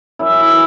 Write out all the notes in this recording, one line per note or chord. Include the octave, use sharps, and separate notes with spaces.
F#2 E4
E4
E3